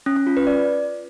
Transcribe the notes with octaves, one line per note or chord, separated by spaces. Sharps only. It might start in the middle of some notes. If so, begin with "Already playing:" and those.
C#4
C#4
F4
B4
D5